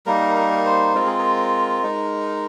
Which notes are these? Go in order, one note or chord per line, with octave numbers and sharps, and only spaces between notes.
G3 A#3 D#4 A#4
A#4
C5
G#3 C4 F4 A#4
G#4
A#4
G#3 D#4